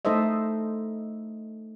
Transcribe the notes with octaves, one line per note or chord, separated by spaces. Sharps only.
A3 D#4 A4 C5 D#5 E5